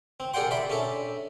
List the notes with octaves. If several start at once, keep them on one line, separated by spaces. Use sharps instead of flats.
C4
G#4 A#4 D5 F#5 G5 C6
D5 E5 B5 C6
C#4 D4 A4 E5